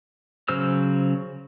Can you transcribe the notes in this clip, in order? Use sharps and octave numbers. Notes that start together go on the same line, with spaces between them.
C#3 F#3 C5 E6 F6